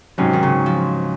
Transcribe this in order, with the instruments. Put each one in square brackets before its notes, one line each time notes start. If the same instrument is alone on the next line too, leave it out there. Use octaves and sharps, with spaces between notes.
[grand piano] G#2 F#3 C#4 [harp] C3
[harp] D#3
C#3
F3